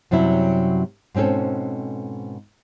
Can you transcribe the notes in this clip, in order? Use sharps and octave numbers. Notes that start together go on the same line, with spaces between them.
F#2 C3 F#3 G3 E4
G#2 B2 C4 C#4 A4